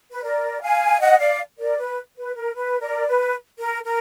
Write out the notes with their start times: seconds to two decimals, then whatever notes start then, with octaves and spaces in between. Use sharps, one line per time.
0.12 B4
0.23 A#4 D5
0.61 F5 G#5
1.00 D#5 F#5
1.19 D5 F5
1.58 A#4 D5
1.78 B4
2.17 B4
2.36 A#4
2.55 B4
2.81 A#4 D5
3.07 B4
3.59 A#4
3.84 A#4